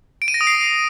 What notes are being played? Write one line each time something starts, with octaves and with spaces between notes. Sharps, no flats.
D7
D#7
A#6
D#6
C7